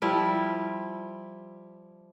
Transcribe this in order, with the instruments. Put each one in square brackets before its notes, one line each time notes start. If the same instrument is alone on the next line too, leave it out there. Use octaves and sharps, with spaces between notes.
[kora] F3 G3 E4